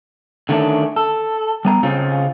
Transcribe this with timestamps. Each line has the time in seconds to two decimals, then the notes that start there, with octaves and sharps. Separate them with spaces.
0.49 D3 D#3 A3 C#4 D4
0.96 A4
1.65 G3 B3 A#5
1.83 C#3 C4 C#4 F4 G#4